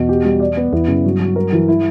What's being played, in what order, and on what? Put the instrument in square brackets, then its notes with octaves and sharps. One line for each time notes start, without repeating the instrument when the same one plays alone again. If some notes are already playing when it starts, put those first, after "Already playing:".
Already playing: [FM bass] E2 [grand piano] B2
[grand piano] G4
G3
D5
B3
[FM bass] E2 [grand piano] E4
[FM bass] F#2 [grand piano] C#3
[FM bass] G2 [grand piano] F#3
[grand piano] F#3
A#4
E3
E4